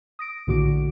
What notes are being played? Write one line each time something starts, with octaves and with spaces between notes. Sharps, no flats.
D#6 A#6 D7
A#1 A2 D3 F#4 D6 D7